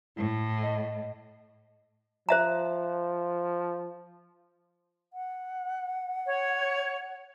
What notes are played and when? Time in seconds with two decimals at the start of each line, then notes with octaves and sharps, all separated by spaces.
0.16 A2 E4
0.63 D#5
2.29 F3 C5 E5 A#5
5.13 F#5
6.26 C#5